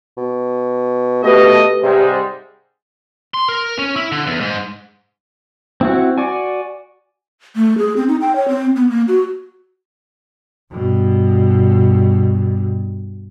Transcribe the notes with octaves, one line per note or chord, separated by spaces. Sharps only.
B2
B2 A3 G4 B4 D#5
G#2 C3 G3 G#3
C6
A#4
C#4
E4
D3
E2
G#2
C4 E4 F#4
F#4 D5 G#5
A3
G#4
C4
D#4
G5
C#5
C4
B3
A#3
F#4
G2 B2